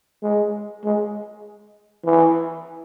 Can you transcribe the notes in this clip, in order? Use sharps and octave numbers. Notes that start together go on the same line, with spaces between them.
G#3
G#3
E3